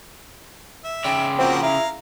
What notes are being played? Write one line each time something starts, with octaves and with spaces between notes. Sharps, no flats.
E5
C#3 D5 G5
F3 A#3 C4 F#4
E4 F5 A#5